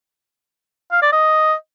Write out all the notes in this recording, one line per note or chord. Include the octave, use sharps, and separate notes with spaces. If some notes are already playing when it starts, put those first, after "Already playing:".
F5
D5
D#5